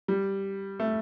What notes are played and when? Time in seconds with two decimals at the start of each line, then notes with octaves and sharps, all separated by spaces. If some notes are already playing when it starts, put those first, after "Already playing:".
0.08 G3
0.80 A3